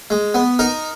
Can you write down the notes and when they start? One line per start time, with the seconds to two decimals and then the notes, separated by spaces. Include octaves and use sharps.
0.10 G#3
0.34 B3
0.59 D#4 A#4